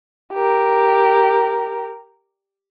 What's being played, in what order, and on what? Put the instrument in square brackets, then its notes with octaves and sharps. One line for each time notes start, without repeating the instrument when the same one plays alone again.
[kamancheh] G4 A#4